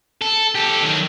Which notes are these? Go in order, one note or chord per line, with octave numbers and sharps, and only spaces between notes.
A4
G4 A4
D#3 F#3